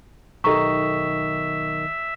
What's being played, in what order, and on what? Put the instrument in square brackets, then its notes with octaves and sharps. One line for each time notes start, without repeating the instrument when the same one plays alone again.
[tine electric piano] B1 D#3 D#5 [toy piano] G4 A4 A#5 [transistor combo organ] E5 [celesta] C#6